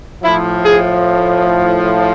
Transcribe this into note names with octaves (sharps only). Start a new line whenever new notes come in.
A2 F3 E4
G#4